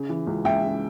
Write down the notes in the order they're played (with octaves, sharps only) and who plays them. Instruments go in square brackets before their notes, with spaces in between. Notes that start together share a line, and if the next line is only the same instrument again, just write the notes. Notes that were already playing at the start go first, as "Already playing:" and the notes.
Already playing: [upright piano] C#3
E3
C#2
C#2 E5 G5
C#3